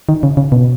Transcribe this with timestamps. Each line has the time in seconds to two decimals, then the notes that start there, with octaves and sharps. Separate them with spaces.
0.09 D#3
0.23 C#3
0.37 C#3
0.52 B2